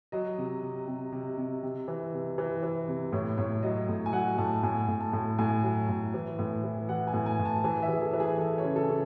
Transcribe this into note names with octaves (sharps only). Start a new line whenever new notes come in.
F#3 D#5
C3
C3
C3
C3
C3
C3
E3
C3
E3
E3
C3
A2 C#5
A2 C#5
F#3 D#5
A2
G#5
F#3 F#5
A2 A5
A2 G#5
A2
A5
A2
A2 G#5
F#3
A2
E3
A2
E3
E3 F#5
G#5
A2
G#5
A2
A5
E3 G#5
E5
E3 G#4
A4
E3
G#4
E3 A4
C#5
C#3
A4
C#3